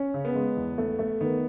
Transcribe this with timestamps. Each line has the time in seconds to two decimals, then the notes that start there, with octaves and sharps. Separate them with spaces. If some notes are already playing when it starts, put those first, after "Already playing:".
Already playing: C#4
0.14 C#3
0.25 B3
0.35 G#3
0.57 E2
0.78 A3
0.99 A3
1.21 D#3 B3